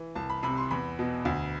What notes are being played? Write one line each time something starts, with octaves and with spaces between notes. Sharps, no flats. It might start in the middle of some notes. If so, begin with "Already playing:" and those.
Already playing: E3
C2 A5
B5
C3 B5
C6
E2 B5
B2
D2